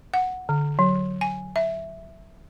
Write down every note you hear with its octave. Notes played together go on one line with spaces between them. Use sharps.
F#5
D3
F#3
G#5
E5